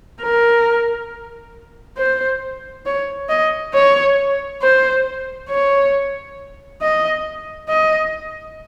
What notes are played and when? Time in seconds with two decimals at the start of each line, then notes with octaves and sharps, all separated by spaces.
0.21 A#4
1.97 C5
2.86 C#5
3.29 D#5
3.74 C#5
4.62 C5
5.49 C#5
6.81 D#5
7.69 D#5